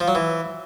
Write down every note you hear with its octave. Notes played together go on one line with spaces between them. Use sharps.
F3
F#3
E3